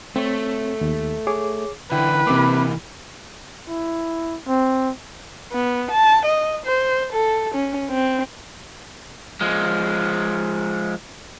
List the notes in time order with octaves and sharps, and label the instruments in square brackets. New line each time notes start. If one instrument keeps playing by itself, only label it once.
[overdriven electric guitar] A3 [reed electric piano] C4 C#5
[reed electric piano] D#2
G#4 C#5 D6
[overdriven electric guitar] D3 E3 [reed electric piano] E4 G5 [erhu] B4
[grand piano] C3 B5 D6 [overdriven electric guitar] E3 A#3
[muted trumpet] E4
C4
[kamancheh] B3
A5
D#5
C5
A4
C#4
C4
[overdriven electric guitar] F3 G#3